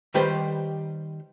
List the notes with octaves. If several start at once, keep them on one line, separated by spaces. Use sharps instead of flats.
D#3 G3 G4 B4 C5